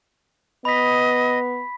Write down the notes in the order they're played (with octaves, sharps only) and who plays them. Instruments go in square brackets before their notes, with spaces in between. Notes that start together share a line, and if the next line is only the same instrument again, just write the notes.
[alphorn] B3 [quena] D#5 [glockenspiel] B5 B6